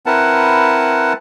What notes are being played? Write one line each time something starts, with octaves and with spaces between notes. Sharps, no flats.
C4 E4 A#4 B4 F#5 A5